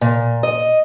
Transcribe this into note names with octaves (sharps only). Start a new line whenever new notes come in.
A#2
D#5